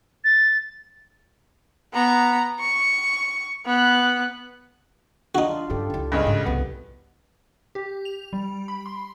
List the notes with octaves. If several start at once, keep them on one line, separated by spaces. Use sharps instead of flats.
A6
B3 A#5
C#6
B3 F#6
D4 D#4 F4 F#4
G2 C#3 G4 A4
C#2 E4
G2 C#3 G#3
G#2
C2 F2 B3
G4
F7
G3
B5
C6